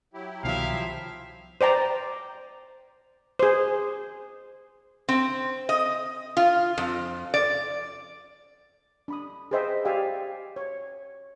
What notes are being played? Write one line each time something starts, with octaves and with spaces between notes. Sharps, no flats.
F#3 E4 G4
C2 B2 D#3 F3 E5 F5
C5 D5 G5 A#5
G#4 C5
C4
D#5
F4
F2
D5
D4 B5 D#6
G#4 B4 C5 D#5 E5 G5
G4 D5 E5 F5 G5 G#5
C#5